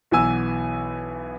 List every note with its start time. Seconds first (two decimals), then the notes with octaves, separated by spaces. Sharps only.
0.11 B1 E3 B3 G#5 E6